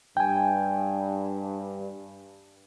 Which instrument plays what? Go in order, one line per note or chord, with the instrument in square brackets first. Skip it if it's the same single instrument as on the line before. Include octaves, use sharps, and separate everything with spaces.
[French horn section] G2 [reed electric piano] G5 G#5